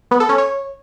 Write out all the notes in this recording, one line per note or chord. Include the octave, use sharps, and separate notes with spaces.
B3
A4
C#4
C#5